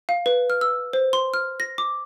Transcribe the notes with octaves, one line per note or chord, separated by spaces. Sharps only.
F5
B4
F6
E6
C5
C6
F6
A#6
D6